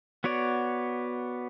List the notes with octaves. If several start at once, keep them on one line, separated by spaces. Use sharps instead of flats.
B3 F#4 C#5 D5